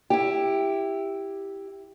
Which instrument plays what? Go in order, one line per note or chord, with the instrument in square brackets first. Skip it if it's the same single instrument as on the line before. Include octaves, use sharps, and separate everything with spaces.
[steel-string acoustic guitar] E4 G4